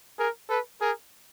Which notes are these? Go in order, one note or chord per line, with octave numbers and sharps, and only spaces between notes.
G#4 A#4
A4 B4
G#4 A#4